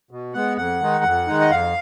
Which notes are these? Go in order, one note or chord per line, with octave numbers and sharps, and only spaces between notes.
B2
G#3 B3 F#5
F2 F#5
D#3 G#3 D#4
F2
D#3 G#3 D#4
D#5
F2 F5